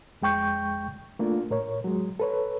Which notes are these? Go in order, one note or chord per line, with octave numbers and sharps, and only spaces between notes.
F2 G#3 G5 C#6 G6
A3 A#3 D4 F4
A2 A#4 C#5
F#3 G#3
A4 B4 C#5